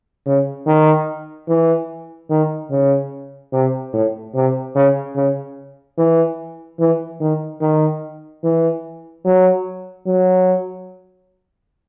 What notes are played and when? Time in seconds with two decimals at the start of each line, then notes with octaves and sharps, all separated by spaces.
0.26 C#3
0.66 D#3
1.48 E3
2.30 D#3
2.71 C#3
3.53 C3
3.93 A2
4.35 C3
4.75 C#3
5.16 C#3
5.98 E3
6.80 E3
7.21 D#3
7.61 D#3
8.44 E3
9.25 F#3
10.07 F#3